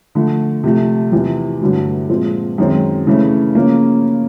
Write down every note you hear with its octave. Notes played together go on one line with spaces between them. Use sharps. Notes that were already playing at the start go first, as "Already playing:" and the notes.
D3 F3 A3
C3 F3 A3
E2 C3 F3
G2 D3 F#3 A3
A#2 F3 G#3 C4
F#2 D#3 G#3 C4
C#3 E3 A3
C#3 F3 A#3 C#4